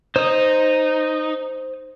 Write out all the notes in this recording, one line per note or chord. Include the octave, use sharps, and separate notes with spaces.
D#4 C5 D#6